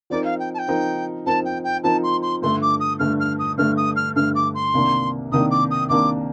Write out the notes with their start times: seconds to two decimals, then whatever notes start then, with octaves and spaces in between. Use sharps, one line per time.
0.10 F3 C4 D#4 A#4 D5
0.24 F5
0.39 G5
0.54 A5
0.59 G5
0.68 F3 C4 D#4 A#4
1.26 F3 C4 D#4 A#4 A5
1.45 G5
1.64 G5
1.84 F3 C4 D#4 A#4 A5
2.03 C6
2.22 C6
2.42 G2 D3 A3 C6
2.62 D6
2.80 D#6
2.99 G2 D3 A3 F6
3.20 F6
3.39 D#6
3.58 G2 D3 A3 F6
3.77 D#6
3.96 F6
4.16 G2 D3 A3 F6
4.35 D6
4.55 C6
4.74 C2 C3 D#3 A#3 D4
5.31 C2 C3 D#3 A#3 D4 D#6
5.51 D6
5.71 D#6
5.89 C2 C3 D#3 A#3 D4 D6